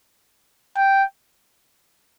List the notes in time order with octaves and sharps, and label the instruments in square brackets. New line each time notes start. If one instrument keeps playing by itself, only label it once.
[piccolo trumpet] G5